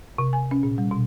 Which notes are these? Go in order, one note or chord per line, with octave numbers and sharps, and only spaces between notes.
C3
G#5
C#4
A#2
G3
B2